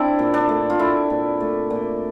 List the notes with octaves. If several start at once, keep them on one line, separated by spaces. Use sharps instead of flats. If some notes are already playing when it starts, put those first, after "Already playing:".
Already playing: C4 D4 E4
A#2
D4
A3
F4
A3 E4
A#2
A3
A#2